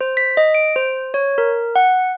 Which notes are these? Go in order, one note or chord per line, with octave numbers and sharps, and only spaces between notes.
C5
B6
D#5
D7
C5
C#5
A#4
F#5